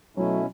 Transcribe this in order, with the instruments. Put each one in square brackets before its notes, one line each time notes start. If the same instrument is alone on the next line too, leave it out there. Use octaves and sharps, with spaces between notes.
[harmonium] B2 A3 C#4 E4 [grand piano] F#3